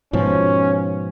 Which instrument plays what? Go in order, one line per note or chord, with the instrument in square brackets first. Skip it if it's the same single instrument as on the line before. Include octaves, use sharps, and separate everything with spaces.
[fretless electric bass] G#2 B2 F3 [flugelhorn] C#4